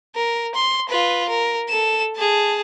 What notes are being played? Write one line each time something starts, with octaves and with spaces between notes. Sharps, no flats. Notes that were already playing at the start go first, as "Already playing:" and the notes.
A#4
C6
F4 B4
A#4
A4 E7
G#4 A5